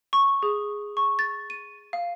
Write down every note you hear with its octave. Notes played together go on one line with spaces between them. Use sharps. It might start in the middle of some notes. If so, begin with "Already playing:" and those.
C#6
G#4
C#6
A6
D#7
F5